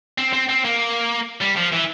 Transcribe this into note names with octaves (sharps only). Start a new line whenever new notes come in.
C4
C4
C4
A#3
G3
F3
E3